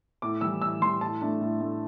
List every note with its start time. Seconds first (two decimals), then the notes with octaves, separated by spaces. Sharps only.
0.22 A2 D6
0.41 E3 G3 E6
0.62 A2 E6
0.81 G3 C6
0.85 E3
1.01 A2 A5
1.22 A3 D4
1.40 A2
1.61 A3 D4